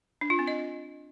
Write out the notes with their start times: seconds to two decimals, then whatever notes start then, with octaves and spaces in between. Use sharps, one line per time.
0.21 D4
0.30 F4
0.39 C4
0.48 D#5